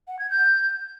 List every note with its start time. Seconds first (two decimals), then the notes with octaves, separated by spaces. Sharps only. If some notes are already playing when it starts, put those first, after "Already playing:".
0.08 F#5
0.19 G#6
0.30 G6